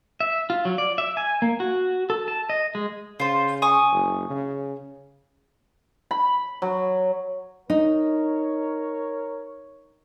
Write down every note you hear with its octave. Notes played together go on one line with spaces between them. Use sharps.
E5
F4
F#3
D5
E5
G#5
A#3
F#4
A4
A5
D#5
G#3
C#3 F4 C5
G#5 C#6 D#6
F#1
C#3
B5
F#3
D#4 A#4 C#5